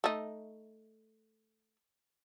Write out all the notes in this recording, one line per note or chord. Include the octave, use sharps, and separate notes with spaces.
A3 D#4